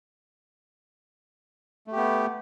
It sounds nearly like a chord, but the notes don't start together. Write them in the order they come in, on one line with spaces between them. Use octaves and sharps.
A3 G4 B3